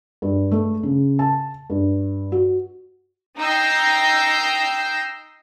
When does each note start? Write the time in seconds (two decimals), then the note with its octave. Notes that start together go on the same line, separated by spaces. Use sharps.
0.22 G2
0.52 A3
0.83 C#3
1.19 A5
1.70 G2
2.32 F#4
3.39 D#4 G5 E6 G6 A#6 C7